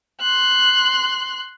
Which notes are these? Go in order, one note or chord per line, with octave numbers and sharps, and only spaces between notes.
C6 F#6